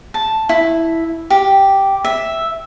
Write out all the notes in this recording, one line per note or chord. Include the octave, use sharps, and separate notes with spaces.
A5
E4
G4
E5